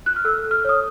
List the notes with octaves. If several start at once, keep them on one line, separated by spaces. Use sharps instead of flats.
F#6
F6
A4 E6
A4
F6
C#5 D#6